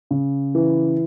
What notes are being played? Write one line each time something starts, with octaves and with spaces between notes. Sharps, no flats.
C#3
E3